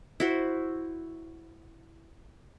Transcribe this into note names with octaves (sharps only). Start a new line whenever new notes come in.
E4 F#4 C5